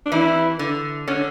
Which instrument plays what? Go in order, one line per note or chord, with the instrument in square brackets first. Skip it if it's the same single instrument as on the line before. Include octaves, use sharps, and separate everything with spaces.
[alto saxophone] D4
[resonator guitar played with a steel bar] E3 [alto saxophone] E4
[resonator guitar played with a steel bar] D3
[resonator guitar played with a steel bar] D3 [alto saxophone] C#4